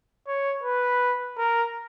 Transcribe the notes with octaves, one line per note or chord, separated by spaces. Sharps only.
C#5
B4
A#4